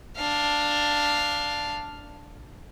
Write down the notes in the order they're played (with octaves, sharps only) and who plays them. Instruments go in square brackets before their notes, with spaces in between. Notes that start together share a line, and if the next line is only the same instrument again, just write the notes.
[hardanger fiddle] D4 F5